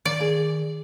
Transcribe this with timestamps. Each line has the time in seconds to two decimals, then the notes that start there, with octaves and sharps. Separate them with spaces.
0.05 D#3 D5
0.20 G#4